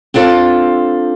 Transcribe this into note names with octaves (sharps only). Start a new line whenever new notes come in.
C4 D4 F4 A4